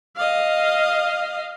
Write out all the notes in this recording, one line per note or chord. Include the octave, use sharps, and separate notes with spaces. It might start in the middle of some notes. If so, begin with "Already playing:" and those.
D#5 F5